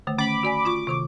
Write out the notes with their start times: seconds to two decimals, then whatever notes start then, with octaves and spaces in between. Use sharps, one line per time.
0.07 D3 D#3 A3
0.18 A3 C#4 B5 D6
0.43 F#4 D5 G#5
0.65 F4 C#6 D6
0.87 C3 D#3 C#6